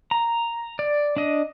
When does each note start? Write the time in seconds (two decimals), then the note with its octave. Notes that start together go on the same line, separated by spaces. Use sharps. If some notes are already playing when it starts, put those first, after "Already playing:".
0.11 A#5
0.79 D5
1.16 D4 D#5